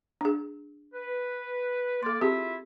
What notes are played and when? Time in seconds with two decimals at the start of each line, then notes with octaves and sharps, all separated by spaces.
0.21 D4 G#4
0.94 B4
2.03 A#3 A4 D5 C6
2.21 C4 E4 F4 G4 G#4 E5